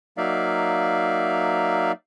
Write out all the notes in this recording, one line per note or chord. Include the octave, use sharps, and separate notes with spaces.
F#3 A#3 D#4 D5 E5 F5